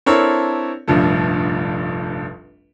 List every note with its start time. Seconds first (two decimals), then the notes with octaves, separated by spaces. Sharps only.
0.06 C4 D4 E4 A4 A#4 C#5
0.87 F1 A#1 G2 F3 A3